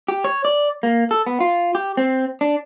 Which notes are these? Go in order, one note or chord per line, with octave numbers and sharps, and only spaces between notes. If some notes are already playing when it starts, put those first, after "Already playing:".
G4
C#5
D5
A#3
A4
B3
F4
G4
C4
D4